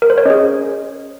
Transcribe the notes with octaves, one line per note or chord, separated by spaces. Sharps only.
A#4
C5
C#5
C#4 G#4 D#5